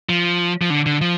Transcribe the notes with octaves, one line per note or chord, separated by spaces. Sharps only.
F3
F3
D3
D3
F3